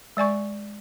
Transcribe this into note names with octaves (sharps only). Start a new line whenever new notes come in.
G#3 D5 G#5 C#6